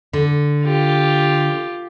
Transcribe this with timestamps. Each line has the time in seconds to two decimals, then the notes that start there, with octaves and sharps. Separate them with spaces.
0.13 D3
0.64 F4 G4